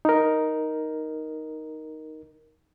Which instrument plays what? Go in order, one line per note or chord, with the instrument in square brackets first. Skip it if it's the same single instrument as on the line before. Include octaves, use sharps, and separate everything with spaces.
[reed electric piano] D#4 A#4